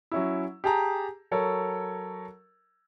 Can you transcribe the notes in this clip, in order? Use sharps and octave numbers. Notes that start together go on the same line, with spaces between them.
F#3 C#4 E4
G4 G#4 A5 A#5
F#3 A4 A#4 C#5